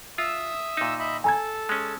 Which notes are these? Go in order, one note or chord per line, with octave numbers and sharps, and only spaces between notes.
F4 E5 D#6 E6
A#2 D#4
D#5 E5 B5
A4 G#5 A#5 G#6
G#3 C#4